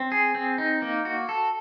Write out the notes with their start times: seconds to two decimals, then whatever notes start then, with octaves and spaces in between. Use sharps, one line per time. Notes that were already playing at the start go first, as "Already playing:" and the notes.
Already playing: C4
0.12 G#4
0.35 C4
0.58 D#4
0.82 A#3
1.05 F#4
1.29 A4